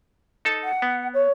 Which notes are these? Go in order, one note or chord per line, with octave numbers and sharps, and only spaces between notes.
D#4 A4 A5
F#5
B3
C#5